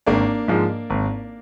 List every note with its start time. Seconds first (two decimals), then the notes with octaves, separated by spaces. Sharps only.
0.06 G#1 A#3 D4
0.48 G#2 F3 G#3
0.90 G#1